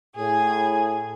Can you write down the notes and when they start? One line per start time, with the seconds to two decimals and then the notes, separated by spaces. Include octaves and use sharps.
0.16 A2 G#4